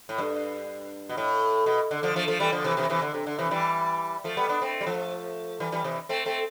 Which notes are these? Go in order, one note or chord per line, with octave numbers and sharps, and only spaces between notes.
A2
G2
B2
A2
B2
D3
D3 F3
F3 A3
F3 A3
E3 G3
D3 F3
C3 E3
C3 E3
C3 E3
D3
C3
D3
C3 E3
E3 G3
F3 A3
G3 B3
B3 D4
A3 C4
G3
F3 A3
E3 G3
E3 G3
C3 E3
A3 C4
A3 C4